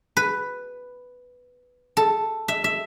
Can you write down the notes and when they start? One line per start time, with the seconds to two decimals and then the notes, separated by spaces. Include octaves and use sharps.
0.17 B4
1.97 A4
2.48 E5
2.64 E5